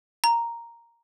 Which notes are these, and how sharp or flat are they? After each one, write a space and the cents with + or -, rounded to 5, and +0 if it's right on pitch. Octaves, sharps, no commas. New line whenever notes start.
A#5 +0